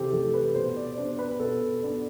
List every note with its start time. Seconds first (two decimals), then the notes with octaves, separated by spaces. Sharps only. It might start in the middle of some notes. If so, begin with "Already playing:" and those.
Already playing: C3 E3 G4 A4 C5
0.13 E3 A3 A4
0.34 B4
0.55 B2 C5
0.76 D5
0.97 B3 D4 C5
1.19 B4
1.40 B2 A4
1.82 B3 D4